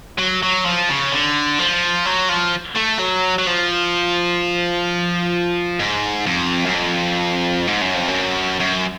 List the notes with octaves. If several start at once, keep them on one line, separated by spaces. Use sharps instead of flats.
F#3
F#3
F3
C#3
D3
F3
F#3
F3
A3
F#3
F#3
F3
G#2
F2
F#2
F2
G#2
F#2
F2
F#2
F#2